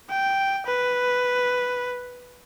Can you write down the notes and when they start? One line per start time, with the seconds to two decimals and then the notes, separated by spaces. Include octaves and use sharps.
0.10 G5
0.67 B4